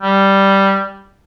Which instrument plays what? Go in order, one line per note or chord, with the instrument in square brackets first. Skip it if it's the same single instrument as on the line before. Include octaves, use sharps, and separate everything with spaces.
[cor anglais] G3